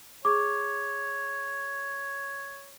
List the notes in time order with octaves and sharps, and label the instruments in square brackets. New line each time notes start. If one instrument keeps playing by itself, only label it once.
[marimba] G#4 C#6 [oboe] C#5 [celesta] D6